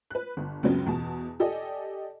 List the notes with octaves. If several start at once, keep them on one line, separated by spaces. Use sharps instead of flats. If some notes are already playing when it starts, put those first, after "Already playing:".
B4 F#6
G1
C#2 F#2 C#3 F#3 B3 C4
E2 B2 A5
G4 A4 D5 D#5 G#5